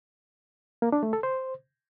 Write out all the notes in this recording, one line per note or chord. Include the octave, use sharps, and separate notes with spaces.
A#3
D4
A3
A4
C5